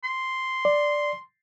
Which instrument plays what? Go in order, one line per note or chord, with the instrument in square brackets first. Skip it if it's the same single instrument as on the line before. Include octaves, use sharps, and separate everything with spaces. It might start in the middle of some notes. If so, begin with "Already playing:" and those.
[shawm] C6
[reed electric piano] D5